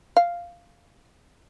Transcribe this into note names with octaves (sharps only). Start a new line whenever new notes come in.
F5